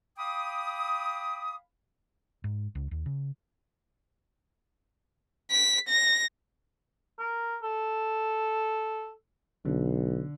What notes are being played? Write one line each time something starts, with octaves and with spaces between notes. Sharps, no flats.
F5 G5 B5 D6 D#6
G#2
C#2
D#2
C#3
B6
A#6
A#4
A4
B1 D3